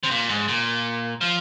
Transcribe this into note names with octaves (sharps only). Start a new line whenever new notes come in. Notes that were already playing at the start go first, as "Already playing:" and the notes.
C3
A#2
G#2
A#2
F3